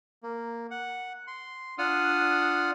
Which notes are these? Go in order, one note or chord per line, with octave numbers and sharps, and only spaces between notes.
A#3
F#5
C6
D4 F4 F#5 D#6 F6